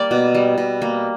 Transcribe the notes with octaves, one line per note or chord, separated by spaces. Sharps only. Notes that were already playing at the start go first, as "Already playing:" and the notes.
Already playing: G3 A#3 D5
B2
G3
B2
A#3